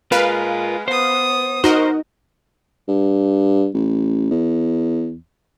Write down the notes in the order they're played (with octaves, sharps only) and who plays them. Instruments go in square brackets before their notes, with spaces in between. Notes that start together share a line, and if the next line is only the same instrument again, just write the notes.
[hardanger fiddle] G#3 [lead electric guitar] F4 A#4 [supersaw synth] B4 F5
[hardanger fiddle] B3 D#6 [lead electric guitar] C5
[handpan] D#4 [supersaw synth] F#4 A#4 D#5 [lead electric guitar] C5
[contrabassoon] G2
A1
E2